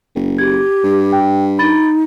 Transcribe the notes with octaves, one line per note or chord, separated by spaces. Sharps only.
F#1
G4 G#6
G2
G5
D#4 B5 A6